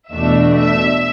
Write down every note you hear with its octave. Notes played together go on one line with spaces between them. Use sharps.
E2 B2 A3 D4 E5
E5